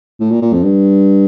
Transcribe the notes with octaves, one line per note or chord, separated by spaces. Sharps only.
A2
A#2
A#2
F2
G2